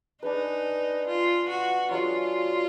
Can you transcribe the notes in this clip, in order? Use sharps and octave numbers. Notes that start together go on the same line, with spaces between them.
D4 D#4 G#4 B4
F4
F#4
F#3 D4 F4 G#4 D#5